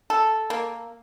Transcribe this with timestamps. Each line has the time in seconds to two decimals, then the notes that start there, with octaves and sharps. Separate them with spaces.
0.10 A4
0.50 A#3